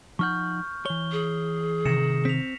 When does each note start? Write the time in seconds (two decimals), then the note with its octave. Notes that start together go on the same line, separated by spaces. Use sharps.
0.19 F3 D#4 F#5 C#6 F6 G6
0.86 E3 C#5 G7
1.11 G#4
1.85 C3 D#3 A#6 C#7 E7
2.25 C4 B6 F7